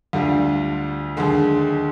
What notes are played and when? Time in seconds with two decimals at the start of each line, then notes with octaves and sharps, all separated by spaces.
0.13 D2 D3 G3 D4 F4
1.17 D#2 D3 G#3